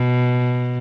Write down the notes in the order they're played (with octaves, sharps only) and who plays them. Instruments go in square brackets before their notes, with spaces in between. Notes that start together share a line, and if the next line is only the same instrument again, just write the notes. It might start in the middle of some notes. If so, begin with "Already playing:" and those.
Already playing: [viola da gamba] B2